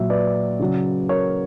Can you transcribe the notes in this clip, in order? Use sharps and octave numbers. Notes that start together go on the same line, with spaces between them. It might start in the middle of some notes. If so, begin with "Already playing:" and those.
Already playing: A#2 F#3 E5
B4 D5
C#3 F#3
A#4 C#5